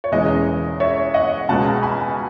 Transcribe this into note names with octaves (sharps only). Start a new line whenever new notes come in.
C#5
E1 E2 C#3 E3 G#3 D#5
C#5 E5
D#5 F#5
C#2 B2 G#3 B3 F#5 A5
G#5 B5